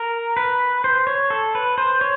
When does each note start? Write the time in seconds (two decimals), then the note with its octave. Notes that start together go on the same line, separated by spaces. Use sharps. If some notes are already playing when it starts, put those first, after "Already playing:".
Already playing: A#4
0.37 B4
0.84 C5
1.07 C#5
1.30 A4
1.55 B4
1.78 C5
2.01 C#5